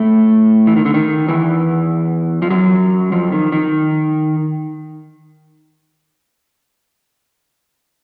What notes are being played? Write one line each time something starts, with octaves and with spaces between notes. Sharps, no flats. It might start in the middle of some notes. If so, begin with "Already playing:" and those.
Already playing: A2 A3
E3
D#3
D3
D#3
E2 E3
F3
F#2 F#3
F2 F3
D#3
D#3